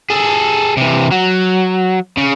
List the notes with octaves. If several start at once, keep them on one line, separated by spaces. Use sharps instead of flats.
G#4 A4
C3 E3
F#3
C#3